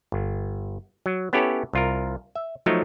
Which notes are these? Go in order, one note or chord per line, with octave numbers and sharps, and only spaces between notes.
G1
F#3
B3 C#4 E4 G4 A4 C#5
C2 F4 A#4
E5
F3 F#3 A3 D#4 C#5